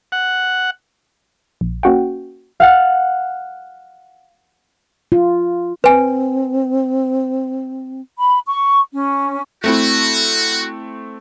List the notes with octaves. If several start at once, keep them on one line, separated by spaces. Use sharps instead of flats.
F#5
A#1
A#3 C#4 F#4 F#5 G5
F5 F#5 A6
F4
C4 B4 G#5
B5
C#6
C#4
A3 C4 E4 F#4